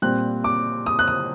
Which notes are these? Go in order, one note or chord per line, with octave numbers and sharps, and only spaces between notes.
A#2 G3 C4 F#6
D6
D#6
F#6
D#6